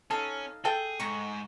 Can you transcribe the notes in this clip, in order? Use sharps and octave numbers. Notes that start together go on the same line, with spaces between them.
C#4 D#4 A4 F5 A5
G#4 A4 G5
G#2 A#5 C#6